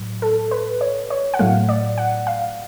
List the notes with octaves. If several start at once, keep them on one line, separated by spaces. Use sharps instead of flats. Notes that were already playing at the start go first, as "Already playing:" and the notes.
Already playing: A2 F#3
A4
B4
C#5
C#5
F#5
A2 F#3 A3 F5
D5
F#5
F5